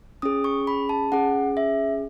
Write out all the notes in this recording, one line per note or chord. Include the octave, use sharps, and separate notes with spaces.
C#4 G#4 D#6
C#6
B5
A5
C#4 G#4 F#5
E5